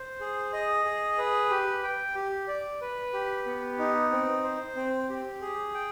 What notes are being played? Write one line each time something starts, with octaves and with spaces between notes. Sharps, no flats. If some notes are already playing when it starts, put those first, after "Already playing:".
Already playing: C5
G#4
D#5
G#4
B4
G4
G5
G4
D5
B4
G4
B3
D#4
C4
C5
C4
G4
G#4
G5